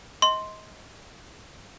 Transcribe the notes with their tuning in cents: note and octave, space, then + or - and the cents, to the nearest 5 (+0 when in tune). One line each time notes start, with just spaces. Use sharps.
D#5 +25 C6 +0